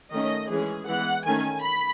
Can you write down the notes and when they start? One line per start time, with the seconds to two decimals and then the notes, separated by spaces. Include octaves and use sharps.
0.12 D#3 A3 C#4 D#5
0.50 E3 G#3 C#4 G#4
0.88 E3 G#3 B3 F#5
1.26 D#3 A3 C#4 G#5
1.63 B5